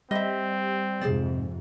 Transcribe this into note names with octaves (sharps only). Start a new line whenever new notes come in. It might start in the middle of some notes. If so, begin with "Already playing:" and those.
G3 C4 D#5 E5
F2 G#2 C3 G#4 C5 D5